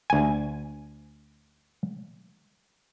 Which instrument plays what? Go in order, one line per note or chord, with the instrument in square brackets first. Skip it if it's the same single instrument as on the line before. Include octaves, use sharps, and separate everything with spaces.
[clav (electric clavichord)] D2 G#5